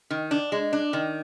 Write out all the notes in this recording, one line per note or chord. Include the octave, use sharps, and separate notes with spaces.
D#3
D4
G#3
D4
D#3